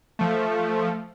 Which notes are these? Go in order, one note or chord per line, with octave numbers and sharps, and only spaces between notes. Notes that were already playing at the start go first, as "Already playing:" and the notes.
F3 A3